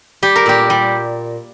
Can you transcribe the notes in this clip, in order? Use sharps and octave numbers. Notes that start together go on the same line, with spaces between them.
G3 G4
A#4
A#2 G4
G3